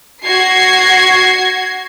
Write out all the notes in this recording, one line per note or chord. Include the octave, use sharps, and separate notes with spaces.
F#4 G#6 C7